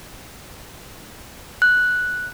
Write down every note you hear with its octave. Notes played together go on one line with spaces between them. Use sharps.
F#6